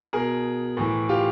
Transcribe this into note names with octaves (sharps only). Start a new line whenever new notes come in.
B2 G#4 A#4
A2 E3
F4 G4